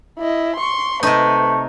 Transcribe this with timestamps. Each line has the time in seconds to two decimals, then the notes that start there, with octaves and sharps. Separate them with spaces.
0.19 E4 D#5
0.56 C6 C#6
1.03 C3 A3 D#4 B4